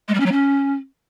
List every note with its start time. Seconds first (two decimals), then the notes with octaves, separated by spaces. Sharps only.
0.08 G#3
0.14 G3
0.20 C#4
0.26 F#3
0.32 C#4